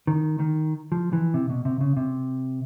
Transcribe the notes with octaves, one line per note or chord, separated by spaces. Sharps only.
D#3
D#3
F3
E3
C3
B2
C3
C#3
C3